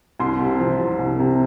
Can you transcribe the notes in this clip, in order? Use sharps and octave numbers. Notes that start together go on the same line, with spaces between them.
C2 C6
C3
F3
C2
C2
C3